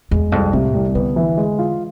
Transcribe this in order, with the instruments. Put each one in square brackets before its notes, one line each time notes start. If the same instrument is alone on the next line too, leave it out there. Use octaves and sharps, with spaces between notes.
[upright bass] E2 [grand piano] G#3
[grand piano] C2 [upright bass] F2
[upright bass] A2 [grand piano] C3
[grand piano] C2
[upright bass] D3 [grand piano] B3
[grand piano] E3
G#3
F4